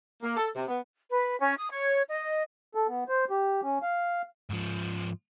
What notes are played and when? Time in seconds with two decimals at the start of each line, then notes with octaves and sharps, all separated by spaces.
0.22 A#3
0.36 A4
0.55 C3
0.68 B3
1.12 B4
1.39 C#4
1.58 D#6
1.71 C#5
2.10 D#5
2.75 A4
2.88 B3
3.09 C5
3.30 G4
3.63 C#4
3.83 F5
4.50 G#2 F3